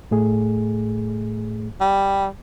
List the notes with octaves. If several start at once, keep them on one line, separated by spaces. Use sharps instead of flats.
A2 A3 G#4
G3